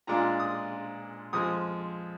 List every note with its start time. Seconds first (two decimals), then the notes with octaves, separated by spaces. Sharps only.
0.07 A#2 G#3 D4 F4 A#5
0.40 D#6
1.33 F2 F3 G#3 D#6